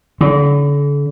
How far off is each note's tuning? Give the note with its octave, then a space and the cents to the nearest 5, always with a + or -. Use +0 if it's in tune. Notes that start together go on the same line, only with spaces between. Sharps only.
D3 -40